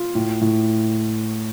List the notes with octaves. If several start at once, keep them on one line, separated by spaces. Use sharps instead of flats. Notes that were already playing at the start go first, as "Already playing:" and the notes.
Already playing: F4
A2
A2